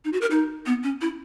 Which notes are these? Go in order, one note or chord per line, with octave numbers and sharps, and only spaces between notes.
D#4
F#4
A#4
D#4
B3
C#4
E4